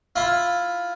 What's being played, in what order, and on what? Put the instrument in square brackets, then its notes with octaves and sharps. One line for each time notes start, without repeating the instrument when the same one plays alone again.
[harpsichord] E4 F4